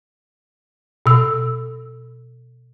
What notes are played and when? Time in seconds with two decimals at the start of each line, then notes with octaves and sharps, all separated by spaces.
1.06 B2 E6